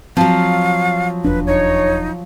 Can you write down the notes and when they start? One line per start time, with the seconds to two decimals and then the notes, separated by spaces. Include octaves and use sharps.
0.17 F3 F#3 C4 F5
1.24 E1 D#2 D4 B4
1.47 D#4 C#5